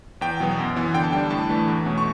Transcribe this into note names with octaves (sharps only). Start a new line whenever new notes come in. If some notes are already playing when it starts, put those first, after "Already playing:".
E2 G5
B2 F#3 B3
F#2
E3 B3
D3 G5
A5
G3 D4 G5
A2 A5
E3 A3 D4
E2
B2 A3 C#4
C#6